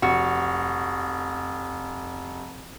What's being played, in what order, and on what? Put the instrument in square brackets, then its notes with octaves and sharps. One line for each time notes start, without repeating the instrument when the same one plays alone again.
[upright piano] F1 [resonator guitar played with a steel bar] F#4